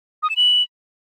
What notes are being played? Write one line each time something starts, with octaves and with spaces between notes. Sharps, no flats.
D#6
E7
F#7